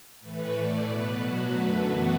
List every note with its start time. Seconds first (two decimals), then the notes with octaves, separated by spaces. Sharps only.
0.20 A2 E3 A3 B4
0.52 A2 A3 D5
0.83 B2 B3 B4
1.15 B2 F#3 B3 F#4
1.46 F#2 D3 A3 B4
1.78 F#2 E3 B3 F#4